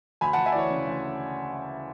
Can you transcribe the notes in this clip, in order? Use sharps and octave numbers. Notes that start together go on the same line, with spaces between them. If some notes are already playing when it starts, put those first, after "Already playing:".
D2 G#5 B5
D2 F#5 A5
E5 G#5
D5
E3 C#5
C#3
D2